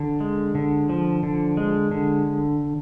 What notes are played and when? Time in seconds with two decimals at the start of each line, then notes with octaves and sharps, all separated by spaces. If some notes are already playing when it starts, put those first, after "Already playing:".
Already playing: D3
0.20 G#3
0.55 D3
0.89 F3
1.23 D3
1.57 G#3
1.91 D3